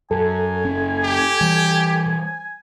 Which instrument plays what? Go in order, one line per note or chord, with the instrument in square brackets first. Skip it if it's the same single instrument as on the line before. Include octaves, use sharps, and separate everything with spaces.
[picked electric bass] F#2 [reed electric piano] A4 [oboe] G#5
[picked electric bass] F#1 C#4
[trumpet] G4
[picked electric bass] E3 G3